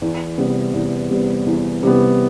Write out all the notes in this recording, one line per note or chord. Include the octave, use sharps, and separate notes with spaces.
E2
C3 G3 B3
E2
C3 G3 B3
E2
C3 G3 B3